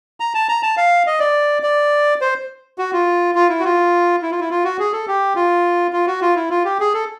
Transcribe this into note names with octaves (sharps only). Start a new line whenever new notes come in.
A#5
A5
A#5
A5
F5
D#5
D5
D5
C5
F#4
F4
F4
E4
F#4
F4
E4
F4
E4
F4
F#4
G#4
A4
G4
F4
F4
F#4
F4
E4
F4
G4
G#4
A4